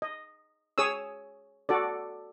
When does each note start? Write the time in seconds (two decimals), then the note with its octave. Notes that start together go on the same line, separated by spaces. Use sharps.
0.02 D#5
0.78 G#4 C#5 D#6 E6
1.69 F#4 A4 D5